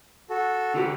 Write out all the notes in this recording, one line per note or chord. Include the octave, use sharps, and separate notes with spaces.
F#4 A4
D3 F#4 G4